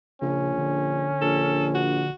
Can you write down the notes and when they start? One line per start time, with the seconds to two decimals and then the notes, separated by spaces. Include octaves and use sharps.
0.22 A#1 C#3 C#4
0.58 D3
1.21 A#1 A4
1.75 F#4